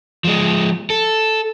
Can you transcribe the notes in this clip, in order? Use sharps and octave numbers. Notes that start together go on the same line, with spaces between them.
F3 G#3
A4